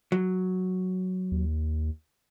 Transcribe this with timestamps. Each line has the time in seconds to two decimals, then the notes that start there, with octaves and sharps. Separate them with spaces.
0.12 F#3
1.32 D#2